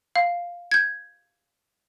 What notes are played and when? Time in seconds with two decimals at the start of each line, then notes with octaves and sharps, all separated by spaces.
0.16 F5
0.71 G6 G#6